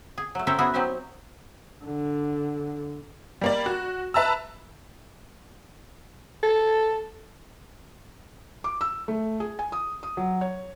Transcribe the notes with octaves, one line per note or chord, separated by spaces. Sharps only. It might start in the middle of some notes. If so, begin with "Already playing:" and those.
G#4
F#3 A3
C4 C#4 A4 A#4 C5 E5
B3 E4 F#4 G#4
F#3 C4 D#4 G4 E5
D3
G3 A#3 D5
F#4
B4 E5 A5 A#5 E6
A4
D6
E6
A3
G#4
G#5
D#6
D#6
F#3
C#5